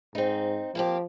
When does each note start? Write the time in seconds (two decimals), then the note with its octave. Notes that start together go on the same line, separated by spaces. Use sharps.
0.15 G#2 C4 D#4
0.75 F3 A#3 C4 G4